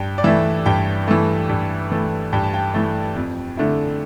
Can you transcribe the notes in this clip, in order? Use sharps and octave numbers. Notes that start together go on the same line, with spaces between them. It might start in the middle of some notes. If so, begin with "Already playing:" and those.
Already playing: G2 G5
D5
E3 A3 E5
G2 G5
E3 A3
G2
E3 A3
G2 G5
A5
G5
E3 A3
F2
D3 A3 E4